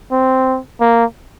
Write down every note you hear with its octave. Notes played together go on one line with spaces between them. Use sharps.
C4
A#3